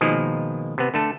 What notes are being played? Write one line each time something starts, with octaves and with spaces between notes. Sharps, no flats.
B2 D#3 F3 G#3 A#3
C3 B3
D3 A3 A4